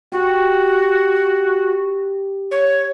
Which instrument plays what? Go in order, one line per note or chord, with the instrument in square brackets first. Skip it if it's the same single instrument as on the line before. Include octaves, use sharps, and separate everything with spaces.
[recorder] F#4 [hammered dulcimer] G4
[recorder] C#5